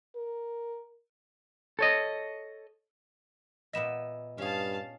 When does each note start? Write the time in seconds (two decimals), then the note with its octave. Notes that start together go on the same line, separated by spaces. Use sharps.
0.16 A#4
1.79 A4 C#5 D#5
3.73 A#2 B3 D#5 E5 E7
4.38 G2 C#4 G#4 F5 A5